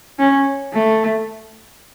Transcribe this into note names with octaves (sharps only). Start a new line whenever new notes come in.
C#4
A3